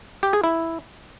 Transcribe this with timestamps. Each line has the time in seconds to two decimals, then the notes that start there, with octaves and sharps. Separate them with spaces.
0.23 G4
0.33 G#4
0.44 E4